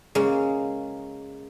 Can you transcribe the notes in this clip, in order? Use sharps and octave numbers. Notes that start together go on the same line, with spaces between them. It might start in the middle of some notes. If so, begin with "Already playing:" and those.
C#3 G#3 A#3